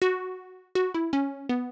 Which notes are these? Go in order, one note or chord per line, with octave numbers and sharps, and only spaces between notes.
F#4
F#4
E4
C#4
B3